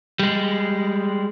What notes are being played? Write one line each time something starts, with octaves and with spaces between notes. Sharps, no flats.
G3 G#3